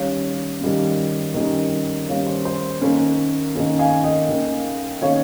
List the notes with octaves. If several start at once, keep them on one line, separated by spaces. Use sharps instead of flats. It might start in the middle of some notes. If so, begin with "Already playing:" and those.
Already playing: D#3 G3 C#4 C#5 F5
D#3 G3 C#4
D#3 G3 C#4
D#3 G3 C#4 C#5 F5
C5
C5
D#3 A#3 C#4
D#3 A#3 C#4
F5 G#5
D#5 G5
D#3 A#3 C#4
D#3 A#3 C#4 C#5 F5